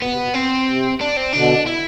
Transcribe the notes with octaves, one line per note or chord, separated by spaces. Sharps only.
B2 B3
C3
B2
C4
C3
D4
C4
B2 D3 D4
E4